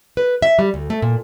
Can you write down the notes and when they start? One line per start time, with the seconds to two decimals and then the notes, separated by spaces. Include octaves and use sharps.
0.17 B4
0.42 E5
0.59 G3
0.74 D2
0.90 A3
1.02 A#2